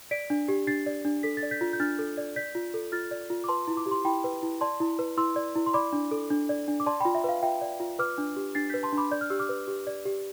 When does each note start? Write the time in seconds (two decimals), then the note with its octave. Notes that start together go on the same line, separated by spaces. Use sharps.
0.11 D5 B6 D7
0.30 D4
0.48 G4
0.67 D4 A6 C7
0.86 D5
1.05 D4
1.23 A4 B6
1.37 A6
1.43 D5
1.51 G6 B6
1.61 F4
1.73 G6
1.80 D4 F6 A6
1.99 A4
2.17 D5
2.36 D5 G6 B6
2.55 F4
2.74 A4
2.92 F4 F6 A6
3.11 D5
3.30 F4
3.44 D6
3.48 B4 A5 C6
3.68 E4
3.77 D6
3.86 G4
3.91 C6
4.05 E4 G5 B5
4.24 B4
4.43 E4
4.61 D5 A5 C6
4.80 E4
4.99 B4
5.17 E4 C6 E6
5.36 D5
5.56 E4
5.66 C6
5.73 D5 B5 D6
5.93 D4
6.11 A4
6.30 D4
6.49 D5
6.68 D4
6.80 D6
6.86 D5 A5 C6
7.00 F4 G5 B5
7.15 E5
7.24 B4 F5
7.42 F4 E5 G5
7.61 D5
7.80 F4
7.99 B4 D6 F6
8.18 D4
8.36 G4
8.55 D4 A6 C7
8.69 B4 G6 B6
8.83 A5 C6
8.92 D4
8.97 B5 D6
9.11 D5 G6
9.21 F6
9.30 G4 E6
9.39 D6 F6
9.49 B4
9.68 G4
9.87 D5
10.05 G4